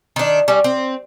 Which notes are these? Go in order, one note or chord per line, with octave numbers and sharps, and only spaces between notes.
D#3 D4
G3 C#4
C4